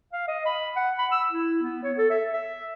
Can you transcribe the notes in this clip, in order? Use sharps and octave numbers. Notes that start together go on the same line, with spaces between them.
F5
D#5
B5
F#5
B5
E6
E4
B3
C#5
A4
E5
E5